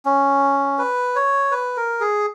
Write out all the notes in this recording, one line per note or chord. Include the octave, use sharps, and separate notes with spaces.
C#4
B4
C#5
B4
A#4
G#4